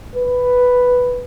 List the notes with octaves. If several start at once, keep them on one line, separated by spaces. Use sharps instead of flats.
B4